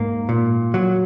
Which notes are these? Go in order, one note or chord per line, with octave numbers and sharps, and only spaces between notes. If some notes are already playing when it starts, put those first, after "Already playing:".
Already playing: G#2 A#3
A#2
F#3